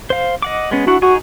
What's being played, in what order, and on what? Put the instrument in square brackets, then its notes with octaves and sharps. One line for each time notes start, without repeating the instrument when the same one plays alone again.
[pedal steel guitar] C5 F5
D#5 F#5 D6
G#3 B3 C#4
[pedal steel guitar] D4 E4 F#5 [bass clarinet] F#4
[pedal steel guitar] D#4 G#4 G#5 [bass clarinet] F#4